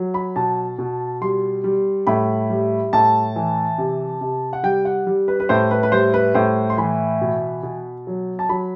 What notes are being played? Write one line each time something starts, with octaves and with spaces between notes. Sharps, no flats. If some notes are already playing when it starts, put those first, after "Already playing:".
Already playing: F#3
B5
B2 A5
B2
G3 C6
G3
A2 B5
G3
A2 A5
E3
C3
C3
F#5
G3 G5
F#5
G3
B4
B4
A2 C5
B4
B4
G3 C5
B4
A2 C5
C6
E3 B5
B2
B2
F#3
A5
F#3 B5